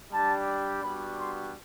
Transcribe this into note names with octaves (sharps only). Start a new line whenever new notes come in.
G3 D4 G4 A5
G3 B3 D4 F#4 B5
C6